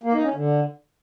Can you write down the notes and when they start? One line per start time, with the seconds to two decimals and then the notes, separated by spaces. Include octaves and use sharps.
0.03 A#3
0.13 D#4
0.23 C#4
0.33 D3